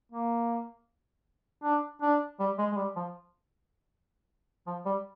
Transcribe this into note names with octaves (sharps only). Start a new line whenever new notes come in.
A#3
D4
D4
G3
G#3
G#3
G3
F3
F3
G3